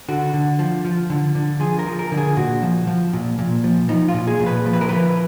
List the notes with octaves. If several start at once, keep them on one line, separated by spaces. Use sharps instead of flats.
D3 F#4
D3
F3
F3
D3
D3
F3 G#4
A#4
F3
A#4
D3
G#4
A#2 F#4
F3
F3
A#2
A#2
F3
F3 D#4
F4
A#2
G#4
A#2
B4
F3
B4
A#4
F3 B4